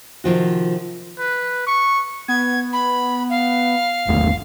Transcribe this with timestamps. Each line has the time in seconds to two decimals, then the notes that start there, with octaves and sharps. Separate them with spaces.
0.24 C3 D#3 F3 F#4
1.19 B4
1.67 C#6
2.28 B3 G#6
2.73 B5
3.30 F5
4.07 G1 D#2 A3